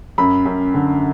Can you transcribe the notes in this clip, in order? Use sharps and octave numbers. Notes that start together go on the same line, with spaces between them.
F#2 B5
F#2
D3